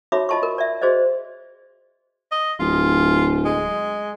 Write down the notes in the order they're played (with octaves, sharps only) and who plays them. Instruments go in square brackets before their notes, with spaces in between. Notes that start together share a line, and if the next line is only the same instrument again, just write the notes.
[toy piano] D#4 F#4 C#5 E5 B5 D6
F4 D#5 A5 C6 C#6
A#4
D5 E5
F#4 G#4 C5 D5 D#5
[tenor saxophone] D#5
[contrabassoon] D1 [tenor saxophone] F4
[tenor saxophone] G#3